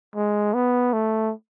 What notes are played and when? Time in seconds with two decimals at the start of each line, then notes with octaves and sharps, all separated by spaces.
0.15 G#3
0.54 B3
0.93 A3